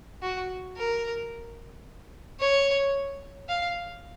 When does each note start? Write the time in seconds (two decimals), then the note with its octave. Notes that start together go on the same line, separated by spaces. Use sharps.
0.22 F#4
0.77 A#4
2.40 C#5
3.49 F5